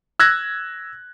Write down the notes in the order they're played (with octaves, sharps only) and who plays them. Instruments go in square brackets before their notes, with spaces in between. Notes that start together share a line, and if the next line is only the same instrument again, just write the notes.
[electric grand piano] E6 F#6 G#6 A#6